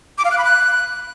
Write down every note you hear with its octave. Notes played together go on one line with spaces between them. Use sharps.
D6
F5
F#6
B5
F#6